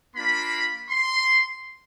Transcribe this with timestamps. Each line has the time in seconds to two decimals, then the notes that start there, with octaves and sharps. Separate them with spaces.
0.15 A#3 D4 F4 B5
0.90 C6